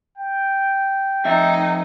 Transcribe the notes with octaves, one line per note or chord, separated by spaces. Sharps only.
G5
F2 D#4 E5